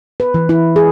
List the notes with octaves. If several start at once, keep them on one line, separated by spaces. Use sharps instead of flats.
B4
E3
E4
G#4